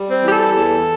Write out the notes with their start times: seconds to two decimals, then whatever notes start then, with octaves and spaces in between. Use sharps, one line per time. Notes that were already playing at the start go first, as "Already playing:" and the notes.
Already playing: G3
0.09 C4
0.23 E3 G4
0.32 A4
0.55 E2